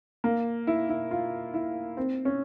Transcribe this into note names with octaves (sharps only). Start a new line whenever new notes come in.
A#3
E4
E4
F4
E4
C4
C#4